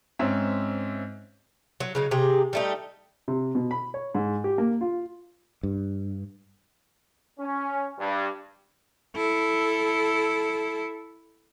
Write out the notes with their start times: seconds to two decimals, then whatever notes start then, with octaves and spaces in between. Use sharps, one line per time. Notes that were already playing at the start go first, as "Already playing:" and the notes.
0.19 G#2 C4 C#4 E5
1.80 F#3
1.95 C#3 F#3 D#4
2.11 C3 G4 G#4
2.53 G3 A3 D#4
3.28 C3
3.55 B2
3.71 B5
3.94 C#5
4.15 G#2
4.44 G4
4.58 A#3
4.81 F4
5.63 G2
7.39 C#4
7.99 G2
9.16 E4 A4